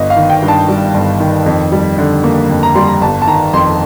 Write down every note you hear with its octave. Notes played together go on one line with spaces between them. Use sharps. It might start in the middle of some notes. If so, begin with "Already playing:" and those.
Already playing: G1 D#5
F5
D#3
G5
G2
A5
G3
G1
D#3
F2
G3
D3
A#3
F2
A#5
G3 C6
A#5
G1 A5
A5
D#3 A#5
F2 C6